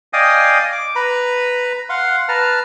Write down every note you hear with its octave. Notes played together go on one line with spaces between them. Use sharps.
D5 D#5 F5 G5 G#5 D#6
D6
B4 A#5 B5
F5 F#5 C6
B4 A5 A#5 F6